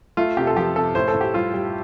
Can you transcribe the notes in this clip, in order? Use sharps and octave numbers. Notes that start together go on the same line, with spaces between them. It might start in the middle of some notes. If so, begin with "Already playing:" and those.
A3 F4
C3 G4
A4
F3 G4
C3 A4
A2 C5
A4
A2
G4
G3 F4
G3